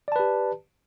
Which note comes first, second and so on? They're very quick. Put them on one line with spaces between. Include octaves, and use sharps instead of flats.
D5 A5 B4 G4